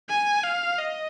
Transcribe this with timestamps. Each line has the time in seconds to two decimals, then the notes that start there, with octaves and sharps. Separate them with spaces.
0.10 G#5
0.44 F5
0.79 D#5